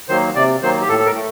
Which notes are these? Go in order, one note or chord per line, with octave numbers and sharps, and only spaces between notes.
D#3 F#3 A#3 C5
C3 D5
D#3 F#3 A#3 C5
G4
A2 A4
A4
A#4
A3